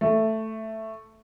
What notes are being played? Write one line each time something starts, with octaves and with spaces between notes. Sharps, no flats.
A3